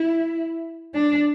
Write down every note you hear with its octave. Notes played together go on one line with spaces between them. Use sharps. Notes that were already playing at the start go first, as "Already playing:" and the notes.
Already playing: E4
D4